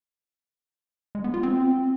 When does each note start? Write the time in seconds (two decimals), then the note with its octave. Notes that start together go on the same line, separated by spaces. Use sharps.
1.15 G#3
1.24 B3
1.34 F4
1.43 C4